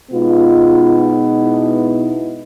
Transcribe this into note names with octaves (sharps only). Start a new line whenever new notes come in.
B2 G#3 B3 D#4 F4
E4